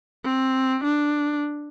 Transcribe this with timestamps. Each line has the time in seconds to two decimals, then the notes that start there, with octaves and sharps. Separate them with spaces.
0.24 C4
0.84 D4